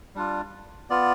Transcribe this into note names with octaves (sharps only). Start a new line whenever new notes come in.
G3 D4 F4
B3 F4 D5